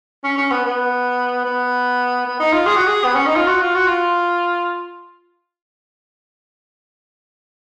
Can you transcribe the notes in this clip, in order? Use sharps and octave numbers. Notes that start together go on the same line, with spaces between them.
C#4
C#4
B3
B3
B3
B3
D#4
F4
G#4
F#4
G#4
B3
C#4
D#4
F4
F#4
F4
F#4
F4